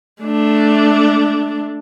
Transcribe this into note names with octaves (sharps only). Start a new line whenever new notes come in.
A3 D4